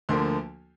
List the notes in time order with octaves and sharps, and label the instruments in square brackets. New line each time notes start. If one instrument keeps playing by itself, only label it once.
[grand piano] D2 D3 F3 A#3 C6